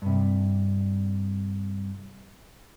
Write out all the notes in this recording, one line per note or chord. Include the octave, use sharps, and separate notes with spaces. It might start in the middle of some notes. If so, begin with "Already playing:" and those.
G2 C3